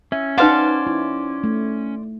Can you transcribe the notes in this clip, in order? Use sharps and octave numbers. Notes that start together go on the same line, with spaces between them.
C#4 E5
D#4 B4 C5 D5 F5 F#5 D6
E4
A3